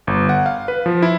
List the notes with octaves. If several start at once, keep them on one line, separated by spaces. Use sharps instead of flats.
G1
F#5
F5
B4
F3
E4